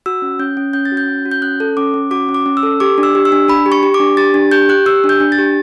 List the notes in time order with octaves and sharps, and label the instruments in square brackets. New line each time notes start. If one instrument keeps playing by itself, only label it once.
[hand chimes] F#4 E6
C#4
C#4 G6
C#4
C#4 G6
A6
F#4
G6
C#4
F#4
G6
C#4 F#6
A4
C#4 D6
C#4
F#4 D6
C#4
D6
C#4
E6
A4
G4 D6
D4
E6
G4
E6
D4
D4 B5
G4
C#6
G4
D6
D4
G4 A6
D4
G4 G6
G4 F#6
G4 E6
D4
G6
D4
A6
G4